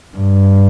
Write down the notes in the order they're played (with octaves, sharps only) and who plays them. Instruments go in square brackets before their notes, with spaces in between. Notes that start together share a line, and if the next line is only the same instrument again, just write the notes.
[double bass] G2